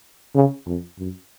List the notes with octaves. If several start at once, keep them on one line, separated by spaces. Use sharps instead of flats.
C#3
F2
F#2